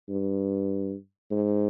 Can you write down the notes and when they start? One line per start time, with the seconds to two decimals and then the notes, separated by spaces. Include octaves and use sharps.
0.09 G2
1.31 G#2